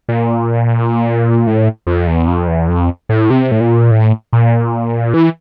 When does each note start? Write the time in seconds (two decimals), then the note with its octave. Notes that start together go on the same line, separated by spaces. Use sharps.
0.09 A#2
1.47 A2
1.87 F2
2.07 E2
2.28 F2
2.48 E2
2.68 F2
3.09 A2
3.30 C3
3.52 A2
3.60 A#2
3.91 A2
4.33 A#2
5.14 E3